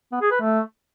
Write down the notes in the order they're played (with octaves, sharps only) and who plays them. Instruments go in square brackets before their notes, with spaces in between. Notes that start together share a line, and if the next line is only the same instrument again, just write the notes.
[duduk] B3
G#4
B4
A3